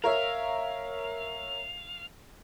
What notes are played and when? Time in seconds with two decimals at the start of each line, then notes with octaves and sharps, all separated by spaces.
0.04 A#4 C#5 E5 F5